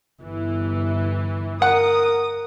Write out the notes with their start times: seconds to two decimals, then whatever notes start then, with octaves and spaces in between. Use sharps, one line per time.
0.22 G1 E3
1.62 A#4 F#5 D#6